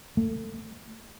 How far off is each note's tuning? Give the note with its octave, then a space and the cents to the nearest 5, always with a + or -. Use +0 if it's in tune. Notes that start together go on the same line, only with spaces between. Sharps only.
A3 +25